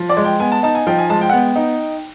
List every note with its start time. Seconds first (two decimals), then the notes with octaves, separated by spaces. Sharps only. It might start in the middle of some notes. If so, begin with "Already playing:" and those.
Already playing: F3
0.09 D5
0.17 G#3
0.24 G5
0.40 B3 G#5
0.52 A5
0.63 D#4 A5
0.75 G#5
0.87 F3 G5
0.98 G#5
1.10 G#3 A5
1.21 G5
1.29 F#5
1.33 B3 G5
1.56 D#4